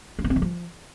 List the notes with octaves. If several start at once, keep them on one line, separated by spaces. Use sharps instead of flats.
C#4
B3
C4
D#3
F3